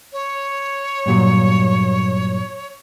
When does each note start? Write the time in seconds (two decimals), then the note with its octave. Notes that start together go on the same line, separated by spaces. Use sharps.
0.13 C#5
1.06 G2 A#2 F#3